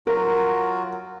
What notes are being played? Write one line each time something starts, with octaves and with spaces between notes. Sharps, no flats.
F#3 F4 F#4 A#4